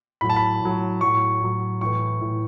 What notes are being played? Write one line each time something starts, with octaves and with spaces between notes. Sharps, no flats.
A2 F#3 B5
A5
B5
A2 F#3
A2 F#3 C#6
A2 F#3
A2 E3 C#6
A2 E3